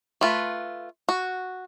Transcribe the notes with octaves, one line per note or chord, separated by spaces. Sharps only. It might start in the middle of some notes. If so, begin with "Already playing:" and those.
A3 F4 B4
F#4